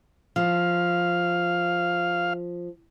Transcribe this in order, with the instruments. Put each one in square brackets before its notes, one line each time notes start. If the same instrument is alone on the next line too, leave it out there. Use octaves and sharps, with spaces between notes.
[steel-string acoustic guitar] F3 [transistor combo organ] F5